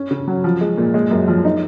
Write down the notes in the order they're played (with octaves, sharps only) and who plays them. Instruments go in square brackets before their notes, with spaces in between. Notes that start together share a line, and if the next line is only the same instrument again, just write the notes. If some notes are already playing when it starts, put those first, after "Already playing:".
Already playing: [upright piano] C#4
C#3
F#3
F3
G#3
A#2
G#3
F#2
F3
D#4